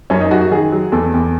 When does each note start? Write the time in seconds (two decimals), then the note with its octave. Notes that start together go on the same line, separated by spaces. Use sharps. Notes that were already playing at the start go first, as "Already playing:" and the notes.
0.10 F#2 C#4
0.20 D#4
0.31 F#2 F#4
0.41 F#4
0.51 D#3 G#4
0.72 F#3
0.92 E2 A4
1.14 E2